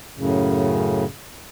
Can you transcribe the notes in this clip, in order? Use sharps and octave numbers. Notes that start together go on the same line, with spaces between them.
F#2 A2 C#3